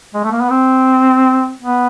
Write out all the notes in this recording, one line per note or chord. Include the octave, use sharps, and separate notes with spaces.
G#3
A3
A#3
B3
C4
B3